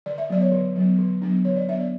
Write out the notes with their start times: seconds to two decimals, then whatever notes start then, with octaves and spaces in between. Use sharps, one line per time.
0.06 D3 D5
0.18 E5
0.30 F#3 B3 D5
0.41 C#5
0.52 D3
0.76 F#3 B3
0.99 D3
1.22 F#3 B3 D4
1.45 D3 C#5
1.56 D5
1.69 F#3 B3 D4 E5
1.80 D5